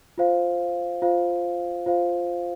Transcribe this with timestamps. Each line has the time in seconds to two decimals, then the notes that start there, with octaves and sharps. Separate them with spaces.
0.18 F4 C5 F5
1.02 F4 C5 F5
1.86 F4 C5 F5